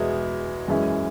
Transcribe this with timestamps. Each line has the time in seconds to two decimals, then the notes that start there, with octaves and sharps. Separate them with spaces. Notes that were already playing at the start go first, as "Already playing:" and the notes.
Already playing: E2 B2 G#3 B3 E4
0.68 F#2 E3 G#3 C#4 E4